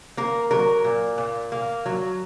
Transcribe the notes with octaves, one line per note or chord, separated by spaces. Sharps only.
A#3 A#4
F#3 A#4
A#2
A#2
A#3
F#3